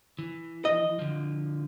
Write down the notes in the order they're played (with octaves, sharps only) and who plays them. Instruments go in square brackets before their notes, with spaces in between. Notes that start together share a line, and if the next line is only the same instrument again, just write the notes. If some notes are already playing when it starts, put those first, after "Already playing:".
[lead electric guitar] E3
[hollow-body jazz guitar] D#5
[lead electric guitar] D3 F3